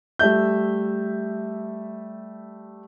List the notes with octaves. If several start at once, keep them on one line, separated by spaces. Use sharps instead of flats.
G3 A3 E5 G6